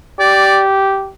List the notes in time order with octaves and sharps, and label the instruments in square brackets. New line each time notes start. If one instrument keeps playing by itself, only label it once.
[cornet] G4 [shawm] D5